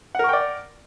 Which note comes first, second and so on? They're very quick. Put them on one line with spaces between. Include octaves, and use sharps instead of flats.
F#5 A#4 C#6 G5 D5